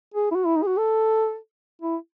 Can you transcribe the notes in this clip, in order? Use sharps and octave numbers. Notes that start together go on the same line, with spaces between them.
G#4
E4
F#4
E4
D#4
G#4
F#4
A4
E4